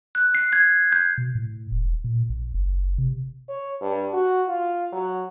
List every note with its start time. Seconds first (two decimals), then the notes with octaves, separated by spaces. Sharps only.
0.15 F#6
0.35 C7
0.53 G#6
0.93 G6
1.18 B2
1.35 A2
1.71 E1
2.04 A#2
2.30 A#1
2.54 F#1
2.98 C3
3.49 C#5
3.81 G2
4.13 F#4
4.48 F4
4.92 F#3